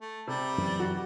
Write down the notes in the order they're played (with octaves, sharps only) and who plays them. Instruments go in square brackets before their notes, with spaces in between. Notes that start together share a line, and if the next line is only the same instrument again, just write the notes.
[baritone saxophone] A3
[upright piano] C3 [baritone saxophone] G3
[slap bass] F#2 E3
[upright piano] F#4